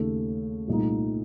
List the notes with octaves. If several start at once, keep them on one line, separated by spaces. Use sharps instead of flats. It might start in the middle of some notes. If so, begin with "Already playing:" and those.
Already playing: D#2 C#3 A3
C2 A#2 A3 D#4